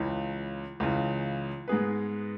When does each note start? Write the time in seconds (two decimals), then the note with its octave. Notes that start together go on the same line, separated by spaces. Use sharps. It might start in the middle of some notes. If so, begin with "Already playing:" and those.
Already playing: C#2 C#3 E3
0.80 C#2 C#3 E3
1.68 G#2 G#3 B3 G#4 B4